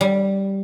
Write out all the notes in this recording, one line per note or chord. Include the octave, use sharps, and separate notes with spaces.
G3